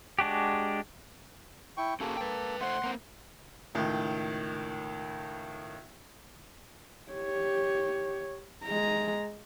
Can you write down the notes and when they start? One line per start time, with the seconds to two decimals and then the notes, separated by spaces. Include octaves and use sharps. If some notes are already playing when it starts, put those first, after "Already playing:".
0.19 G#3 D4 F#4 G4
1.77 E4 G5 C#6
2.00 A#3 C#4 F#4 G#4 A4
2.17 B4 G5
2.61 A3 C5 F#5 C6
2.84 A#3 C4
3.75 C#2 A2 D#3
7.11 G4 C#5
8.65 G#3 A#5